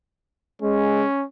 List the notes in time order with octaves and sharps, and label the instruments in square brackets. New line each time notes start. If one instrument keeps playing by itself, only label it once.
[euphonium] G#3 [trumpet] C#4